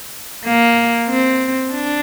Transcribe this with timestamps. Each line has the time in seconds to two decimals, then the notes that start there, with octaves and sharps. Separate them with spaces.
0.44 A#3
1.08 C4
1.72 D4